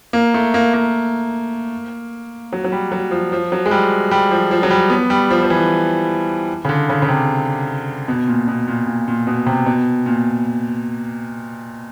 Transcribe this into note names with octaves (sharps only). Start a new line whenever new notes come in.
A#3
A3
A#3
A#3
F#3
F#3
G3
F#3
F3
F3
F#3
G#3
G3
G3
F3
F3
F#3
G3
B3
G3
F3
F3
E3
C#3
D3
C#3
C#3
C3
B2
A#2
B2
A#2
A#2
A#2
B2
C3
B2
A#2